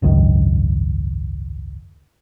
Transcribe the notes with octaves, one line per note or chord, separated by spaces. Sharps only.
G#1 C#2 F#2 D#3